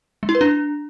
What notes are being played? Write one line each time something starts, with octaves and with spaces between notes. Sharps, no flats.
G#3
E4
B4
D4